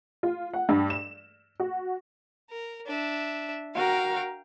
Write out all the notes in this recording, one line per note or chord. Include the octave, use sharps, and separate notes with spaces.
F4
F#5
G2
E7
F#4
A#4
D4 E5
F#4 A#4 F5 G5